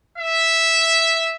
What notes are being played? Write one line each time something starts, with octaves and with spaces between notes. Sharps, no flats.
E5